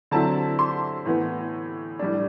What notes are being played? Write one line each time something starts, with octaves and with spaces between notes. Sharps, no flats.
D3 F#3 C4 E4 A5
C6
A2 E3 B3
A2 G3 D4